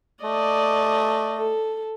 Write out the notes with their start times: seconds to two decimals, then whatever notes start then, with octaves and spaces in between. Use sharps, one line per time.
0.24 A3 D5 D#5
1.38 A4